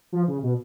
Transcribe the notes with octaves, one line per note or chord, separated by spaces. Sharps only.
F3
C#3
B2